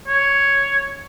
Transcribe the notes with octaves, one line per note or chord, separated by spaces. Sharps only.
C#5